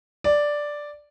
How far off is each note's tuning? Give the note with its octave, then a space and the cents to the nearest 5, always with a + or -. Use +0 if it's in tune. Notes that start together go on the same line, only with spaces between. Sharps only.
D5 +0